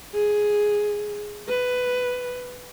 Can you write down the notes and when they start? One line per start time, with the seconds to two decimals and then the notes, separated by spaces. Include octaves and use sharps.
0.14 G#4
1.48 B4